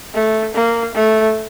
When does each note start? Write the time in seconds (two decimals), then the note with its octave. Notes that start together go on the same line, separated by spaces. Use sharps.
0.14 A3
0.55 A#3
0.95 A3